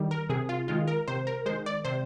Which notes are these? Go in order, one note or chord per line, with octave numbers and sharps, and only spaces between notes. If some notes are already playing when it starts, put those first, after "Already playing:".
Already playing: D#3 G3
A#4
C3 G#4
F4
D#3 G#3 F4
A#4
C3 C5
A#4
D#3 G#3 C5
D5
C3 C5